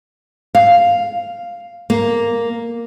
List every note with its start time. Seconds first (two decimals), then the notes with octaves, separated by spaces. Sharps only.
0.55 F5
1.90 A#3